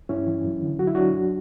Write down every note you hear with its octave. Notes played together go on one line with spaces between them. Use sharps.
G2 C#4 E4
E3
F#2
D3
F#3 F#4
E4
F#3 D4 F#4
F#2